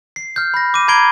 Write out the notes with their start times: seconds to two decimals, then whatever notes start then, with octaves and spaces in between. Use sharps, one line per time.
0.16 C7
0.36 F6 G6
0.54 B5 A#6
0.74 D6 D#7
0.88 A#5 B5 G#6 C7 D7 G7